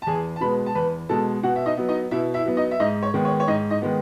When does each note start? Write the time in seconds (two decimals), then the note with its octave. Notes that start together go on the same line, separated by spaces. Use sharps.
0.02 A5
0.07 E2 G#4 G#5
0.36 A5
0.41 B2 G#3 B3 B4 B5
0.66 A5
0.75 E2 B4 B5
1.09 B2 G#3 B3 A4 A5
1.43 B2 F#4 F#5
1.56 E5
1.66 D#4 D#5
1.77 F#3 B3
1.89 D#4 D#5
2.11 B2 E4 E5
2.34 E4 E5
2.46 F#3 B3
2.57 D#4 D#5
2.71 E5
2.80 G#2 D#4 D#5
3.03 C#5
3.14 D#3 G#3 B3
3.25 C#5
3.40 C#5
3.47 G#2 D#4 D#5
3.70 D#4 D#5
3.82 D#3 G#3 B3